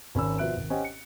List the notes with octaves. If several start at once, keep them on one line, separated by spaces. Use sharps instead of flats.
G#1 C#4 B5 E6
B2 F3 E5 F#6 D7
G#1
C#4 G4 C5 D#5 F#5 G5
C#7